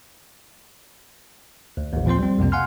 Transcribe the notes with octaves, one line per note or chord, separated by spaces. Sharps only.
D2
A1 D#2
A#2 F3 C4 C5 C6
G3 C4
C2 F2 C3 A#3
F5 F#5 G#5 C6 F6